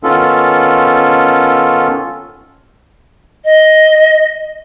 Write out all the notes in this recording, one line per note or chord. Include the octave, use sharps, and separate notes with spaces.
D#3 B3 C#4 F4 A4
D#5